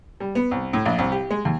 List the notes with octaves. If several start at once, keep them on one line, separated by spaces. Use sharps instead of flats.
G3
B3
C2
A2
A#1
C2
G4
G#3
D#2